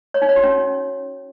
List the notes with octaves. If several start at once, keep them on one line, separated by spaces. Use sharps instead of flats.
C#5
D#4
C#5
F#4
C#4